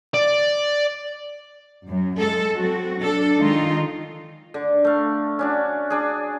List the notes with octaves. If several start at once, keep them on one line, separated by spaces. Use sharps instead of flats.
D5
F#2
G#3 A4
F#3 C4 F#4
D4 A4
D#3 G#3 D#4 F4
D3
A3 F5
C#4 D4 F#4
D4 G#4